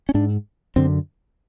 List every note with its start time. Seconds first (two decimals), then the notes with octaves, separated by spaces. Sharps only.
0.09 C#4
0.14 G#2 D4
0.76 F#2 D3 C4